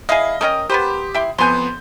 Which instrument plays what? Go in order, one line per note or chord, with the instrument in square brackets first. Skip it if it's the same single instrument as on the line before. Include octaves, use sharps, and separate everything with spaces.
[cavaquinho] E4 G#5 B5 [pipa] G#4 F5 [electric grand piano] D#5
[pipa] A3 C#4 D#5 [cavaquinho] A#4 [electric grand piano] G5 D#6
[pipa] B3 B4 C5 [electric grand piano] G4
[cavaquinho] E4 C6 [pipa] E5 G5
[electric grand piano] F2 B3 G6 [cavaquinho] C5 [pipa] G#5 C6